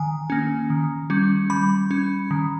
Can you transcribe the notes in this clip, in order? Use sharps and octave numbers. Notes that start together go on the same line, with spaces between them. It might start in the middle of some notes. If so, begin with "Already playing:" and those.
Already playing: D#3 G#5
A#3 C#4
D#3
G3 C#4
G3 B5
C#4
D#3